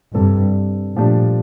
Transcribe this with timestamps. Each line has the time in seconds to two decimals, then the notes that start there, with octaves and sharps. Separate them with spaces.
0.14 G2 C3 G3 D4 A4
0.96 A#2 F3 A3 D4 G4